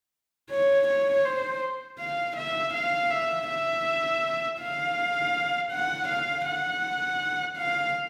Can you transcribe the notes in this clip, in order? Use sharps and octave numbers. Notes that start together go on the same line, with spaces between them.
C#5
C#5
C5
F5
E5
F5
E5
E5
F5
F#5
F5
F#5
F5